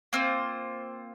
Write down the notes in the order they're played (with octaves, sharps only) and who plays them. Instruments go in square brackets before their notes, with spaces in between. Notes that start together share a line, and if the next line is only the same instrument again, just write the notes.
[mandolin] A#3 C4 F4 C5